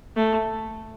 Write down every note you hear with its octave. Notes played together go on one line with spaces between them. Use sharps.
A3